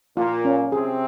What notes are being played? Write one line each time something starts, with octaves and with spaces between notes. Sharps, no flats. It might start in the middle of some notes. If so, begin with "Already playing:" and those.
A#2 A#3 F4
C#4
C3 C4 G#4